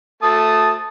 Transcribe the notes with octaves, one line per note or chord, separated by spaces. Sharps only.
A3 A5 D#6